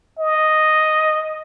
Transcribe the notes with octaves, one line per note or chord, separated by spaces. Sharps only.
D#5